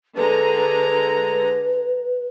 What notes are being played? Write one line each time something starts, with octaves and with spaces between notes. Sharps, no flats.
D3 G#3 B4 A#5